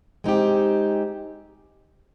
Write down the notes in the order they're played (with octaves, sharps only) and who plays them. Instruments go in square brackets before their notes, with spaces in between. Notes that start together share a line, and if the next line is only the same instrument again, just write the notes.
[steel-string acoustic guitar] G#3 C4 D#4 G4